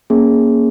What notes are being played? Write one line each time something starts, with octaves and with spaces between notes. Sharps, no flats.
A#3 C#4 G#4